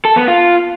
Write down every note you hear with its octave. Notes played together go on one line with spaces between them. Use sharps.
A4
B3
F4